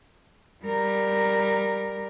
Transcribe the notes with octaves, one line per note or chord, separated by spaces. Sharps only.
G3 A#4